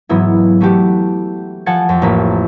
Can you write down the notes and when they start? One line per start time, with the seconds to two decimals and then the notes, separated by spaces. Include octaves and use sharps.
0.09 G#2 E3 F#3 B3 E4
0.60 E3 A3 F#4 G4
1.66 F3 A4 F#5 G#5 A6 C#7
1.89 F2
2.02 A1 A#3 B6